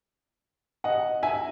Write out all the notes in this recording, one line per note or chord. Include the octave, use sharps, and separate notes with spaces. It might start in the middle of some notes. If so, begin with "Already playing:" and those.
D#5 F#5
E5 G#5